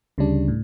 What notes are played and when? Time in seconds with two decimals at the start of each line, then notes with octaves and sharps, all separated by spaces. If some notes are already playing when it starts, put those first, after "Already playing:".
0.18 D2 C#3 G3 D4
0.48 A2